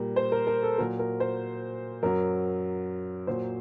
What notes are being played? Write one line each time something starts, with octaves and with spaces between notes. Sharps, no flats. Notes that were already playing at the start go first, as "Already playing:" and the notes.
Already playing: A#2 G3 A#4
C5
A#4
A#4
A4
A#2 F#3 A#4
A#4
C5
F#2 F#3 A#4
A#2 F#3 C5